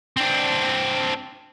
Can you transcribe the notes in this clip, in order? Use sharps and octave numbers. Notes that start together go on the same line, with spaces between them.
C4 D4